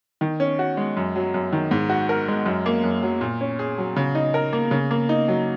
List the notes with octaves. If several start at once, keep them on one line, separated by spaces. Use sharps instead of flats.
D#3
C#4
F#4
G#3
F#2
F#3
F#2
D#3
G#2
F#4
A#4
G#3
F#2
A#3
F#2
F#3
A#2
C#4
G#4
F#3
C#3
D#4
A#4
A#3
C#3
A#3
D#4
F#3